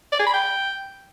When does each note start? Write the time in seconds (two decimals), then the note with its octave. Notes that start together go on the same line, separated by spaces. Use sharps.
0.12 D5
0.19 G#4
0.26 B5
0.34 G5